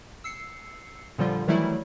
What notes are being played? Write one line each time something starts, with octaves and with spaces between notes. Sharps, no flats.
E6 C7 C#7
A#2 D3 F3 G3 F4
D#3 E3 F#3 G3 A3 E4